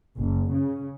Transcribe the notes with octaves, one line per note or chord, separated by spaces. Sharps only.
F#1
C#3